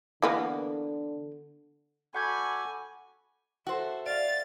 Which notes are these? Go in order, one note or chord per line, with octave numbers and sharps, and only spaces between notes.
D3 E3 A#3 B3
F#4 A4 D5 F#5 G#5 B5 G6 G#6
F#4 A4 C5 E5
D5 E5 F5 A6